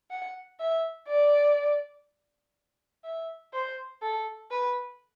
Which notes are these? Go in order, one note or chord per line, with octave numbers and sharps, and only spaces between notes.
F#5
E5
D5
E5
C5
A4
B4